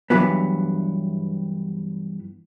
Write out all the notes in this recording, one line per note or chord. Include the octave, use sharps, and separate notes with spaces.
G2 B2 E3 F#3 B3